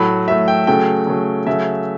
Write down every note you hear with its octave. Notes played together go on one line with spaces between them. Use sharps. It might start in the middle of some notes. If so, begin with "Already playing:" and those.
Already playing: A2 F#3 A3 B5
A2 F#3 A3 E5
G5
C#3 F#3 A3 G5
C#3 F#3 A3
C#3 F#3 A3 E5